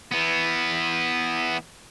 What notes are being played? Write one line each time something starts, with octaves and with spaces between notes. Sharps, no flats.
E3 B3